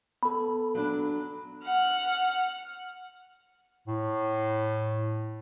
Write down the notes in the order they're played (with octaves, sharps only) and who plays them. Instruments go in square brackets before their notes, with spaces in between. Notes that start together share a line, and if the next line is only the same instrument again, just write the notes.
[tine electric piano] B3 A4 [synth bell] B5
[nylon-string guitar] F#3 D4
[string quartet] F#5 F6
[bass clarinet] A2